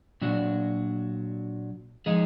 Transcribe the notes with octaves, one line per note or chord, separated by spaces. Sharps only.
A#2 F#3 D4 F#4
F3 G#3 D#4 G#4